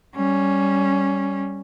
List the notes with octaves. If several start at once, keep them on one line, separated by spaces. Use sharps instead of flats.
G3 C#4